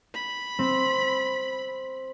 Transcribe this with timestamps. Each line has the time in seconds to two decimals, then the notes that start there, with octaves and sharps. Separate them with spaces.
0.15 B5
0.59 C4